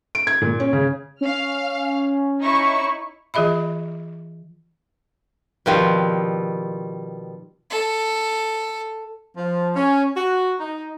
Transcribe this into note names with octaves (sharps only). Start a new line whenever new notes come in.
D7
G#6
A#2
C#4
C#3
C#4 F5 F6
D#4 E4 C#6
E3 F4 G#4 D#5 E5 B5
B2 D#3 F3 G3 C4
A4
F3
C#4
F#4
D#4